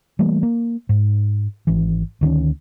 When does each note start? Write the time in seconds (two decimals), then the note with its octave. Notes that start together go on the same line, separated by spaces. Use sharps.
0.19 E3 G3 A3 A#3
0.43 A#3
0.89 G#2
1.67 G#1 E3
2.21 D2 D#3 C4 C#4